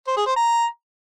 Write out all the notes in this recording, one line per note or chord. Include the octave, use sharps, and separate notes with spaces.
C5
G#4
C5
A#5